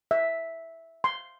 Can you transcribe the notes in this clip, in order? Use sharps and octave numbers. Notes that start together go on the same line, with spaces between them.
E5
C6